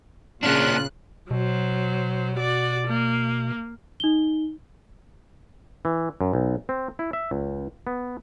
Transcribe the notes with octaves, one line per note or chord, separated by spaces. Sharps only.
A#2 C#3 A#3 C#4 D4 F4 F#6
B2 F#3 C5
F#4 D5
A#3
D#4 G7
E3
F#2
B1
C4
E4
E5
C#2
B3